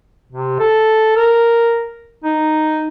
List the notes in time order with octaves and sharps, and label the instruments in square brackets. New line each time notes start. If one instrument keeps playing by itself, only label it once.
[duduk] C3
A4
A#4
D#4